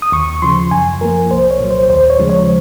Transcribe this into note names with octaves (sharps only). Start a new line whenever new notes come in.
D#6
D#2 C#6
C#3 F3 C6
F#2 G#5
F3 A#3 A#4
C2 C5
C#5
A#2 F#3
C5
D#2 C5
C#5
C#3 F3 G#3
C#5